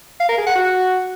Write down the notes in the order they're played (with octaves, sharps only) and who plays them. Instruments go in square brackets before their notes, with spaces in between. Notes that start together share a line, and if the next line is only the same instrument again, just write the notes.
[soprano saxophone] F5
A#4
G#4
F#5
F#4